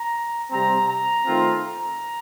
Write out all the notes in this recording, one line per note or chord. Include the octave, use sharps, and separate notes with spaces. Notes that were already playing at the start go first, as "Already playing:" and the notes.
Already playing: A#5
C3 G3 C4 A#5
A#5
D#3 A3 C4 F4
A#5